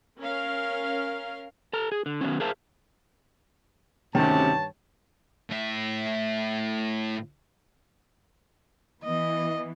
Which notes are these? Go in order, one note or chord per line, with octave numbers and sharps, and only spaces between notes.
C#4 A#4 F5
A4 A#5
G#4
D3
D#3 E3 F#3 B3 C#4
G#4 A#4 C5 E5 F5 A5
D2 G2 C3 D#3 C#4 C#5 A5
A2 E5
E3 B3 D#5